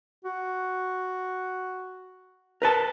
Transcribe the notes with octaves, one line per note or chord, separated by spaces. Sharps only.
F#4
A#4 B4 A5